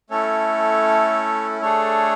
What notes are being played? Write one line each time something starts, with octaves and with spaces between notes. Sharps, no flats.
A3 C#4 E4 A4 C#5
A3 D4 G#4 A4 C#5